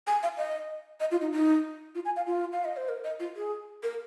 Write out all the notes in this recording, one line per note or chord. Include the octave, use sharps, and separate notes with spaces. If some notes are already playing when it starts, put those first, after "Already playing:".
G#5
F5
D#5
D#5
F4
D#4
D#4
F4
G#5
F5
F4
F5
D#5
C5
A#4
D#5
F4
G#4
A#4